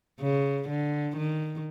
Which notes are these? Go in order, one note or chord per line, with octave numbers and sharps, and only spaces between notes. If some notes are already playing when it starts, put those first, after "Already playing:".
C#3
D3
D#3